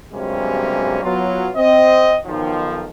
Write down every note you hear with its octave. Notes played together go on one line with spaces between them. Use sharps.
G2 C3 F#3 G#3 A#3 C#4
F#3 B3 F4
C4 D#5
B1 D#3 F3